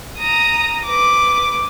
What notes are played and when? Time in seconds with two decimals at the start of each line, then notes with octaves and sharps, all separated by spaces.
0.18 A#5 D#6
0.85 B4 D6